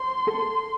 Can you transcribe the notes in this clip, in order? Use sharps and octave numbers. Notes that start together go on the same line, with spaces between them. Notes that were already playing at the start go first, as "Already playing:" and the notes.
Already playing: C5 C6
A4